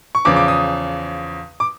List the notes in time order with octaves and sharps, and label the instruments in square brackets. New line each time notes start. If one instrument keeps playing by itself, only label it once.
[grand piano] C#6
E2 C#3 F3 D6
D6
D#6
D6